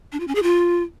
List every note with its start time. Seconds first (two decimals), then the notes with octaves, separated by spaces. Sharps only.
0.12 D4
0.20 F4
0.28 C#4
0.35 G#4
0.43 F4